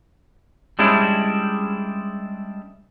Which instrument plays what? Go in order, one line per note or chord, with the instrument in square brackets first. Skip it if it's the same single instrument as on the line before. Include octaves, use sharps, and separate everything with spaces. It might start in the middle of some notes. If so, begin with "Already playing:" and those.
[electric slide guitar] G3 G#3 C#4 D4 E4